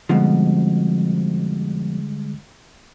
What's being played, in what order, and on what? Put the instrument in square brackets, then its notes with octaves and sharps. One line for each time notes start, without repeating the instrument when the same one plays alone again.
[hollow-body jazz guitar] F2 B2 F3 [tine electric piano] D3 G3 G#3